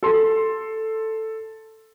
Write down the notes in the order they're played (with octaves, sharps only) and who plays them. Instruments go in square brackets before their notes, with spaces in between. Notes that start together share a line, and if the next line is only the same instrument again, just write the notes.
[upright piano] A4 C6